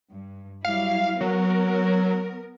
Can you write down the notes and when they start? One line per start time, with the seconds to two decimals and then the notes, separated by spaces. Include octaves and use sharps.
0.12 G2
0.65 F#3 G3 E4 F5
1.21 F#3 B3 A#4